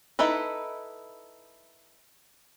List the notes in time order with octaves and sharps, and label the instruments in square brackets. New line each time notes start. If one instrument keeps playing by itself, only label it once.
[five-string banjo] D#4 E4 A4 B4